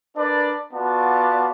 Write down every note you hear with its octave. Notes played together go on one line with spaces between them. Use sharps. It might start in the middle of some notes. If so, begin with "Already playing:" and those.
D4 A#4 B4 D5
B3 F4 F#4 D5 F#5 A5